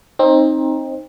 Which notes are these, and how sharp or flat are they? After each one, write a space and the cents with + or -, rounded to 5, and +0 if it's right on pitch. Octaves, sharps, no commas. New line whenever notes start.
C4 +25 D#4 +0